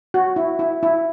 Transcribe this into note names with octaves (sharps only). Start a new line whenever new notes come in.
F#4
E4
E4
E4